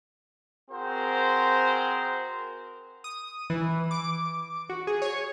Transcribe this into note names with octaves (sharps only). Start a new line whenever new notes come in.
C4 F#4 G#4 A#4 C5
D#6
E3
D6
F#4
G#4
C#5